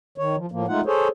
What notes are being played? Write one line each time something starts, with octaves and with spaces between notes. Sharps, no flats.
D#3 C#5
F3
A2 F3 A#3
G#3 A3 D#4 F4 F#5
G#4 A4 C5 C#5